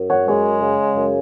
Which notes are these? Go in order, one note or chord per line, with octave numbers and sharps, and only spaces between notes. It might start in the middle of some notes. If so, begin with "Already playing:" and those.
Already playing: F#2
C#5 F#5
G#3 G#4 C#5
C#3
F#2